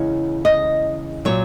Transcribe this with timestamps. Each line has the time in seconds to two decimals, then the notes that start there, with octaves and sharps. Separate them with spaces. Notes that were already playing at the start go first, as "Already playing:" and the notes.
Already playing: E2 C#3 G#3 C#5
0.45 D#5
1.25 A#2 F#3 C#5